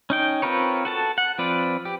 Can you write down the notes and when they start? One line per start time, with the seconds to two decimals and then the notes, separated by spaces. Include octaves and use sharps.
0.10 C#4 D#4 G5
0.42 C4 F4 A#4 B4 C#5
0.85 F#4 A4 A5
1.18 F#5
1.38 F3 C4 F4 B4 D5
1.85 G4